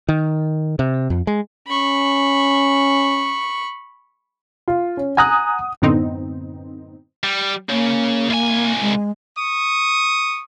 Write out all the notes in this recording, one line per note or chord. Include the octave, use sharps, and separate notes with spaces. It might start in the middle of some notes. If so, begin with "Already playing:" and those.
D#3
C3
F2
G#3
C#4 B5 C#6
F4
C#4
F#5 G#5 A#5 D#6 F#6
F#2 A2 D3 B3 C4 D#4
G3
C#3 A#3
C2 G#5
G#3
C#6 D#6